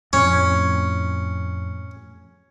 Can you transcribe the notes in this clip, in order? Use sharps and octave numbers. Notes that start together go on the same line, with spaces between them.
F2 A2 C#4